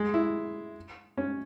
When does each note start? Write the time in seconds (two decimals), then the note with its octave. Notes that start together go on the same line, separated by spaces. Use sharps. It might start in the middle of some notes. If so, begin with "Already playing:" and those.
Already playing: G#3
0.14 E4
1.17 C#4